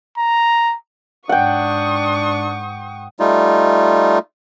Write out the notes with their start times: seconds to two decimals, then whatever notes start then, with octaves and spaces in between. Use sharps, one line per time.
0.18 A#5
1.29 G#2 D4 F#5 G5 C#6 D#6
3.20 G3 A3 D#4 F4